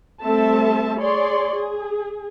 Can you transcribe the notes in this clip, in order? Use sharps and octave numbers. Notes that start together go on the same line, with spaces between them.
G3 A3 C4 A4 E5 A5
G#4 C#5 D5 C6
G#4